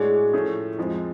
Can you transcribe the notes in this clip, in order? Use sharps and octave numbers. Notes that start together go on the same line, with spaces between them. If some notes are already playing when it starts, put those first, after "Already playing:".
Already playing: A2 G#3 D4 F#4 G#4 C#5
A2 F3 A3 C#4 G#4
F2 F3 G#3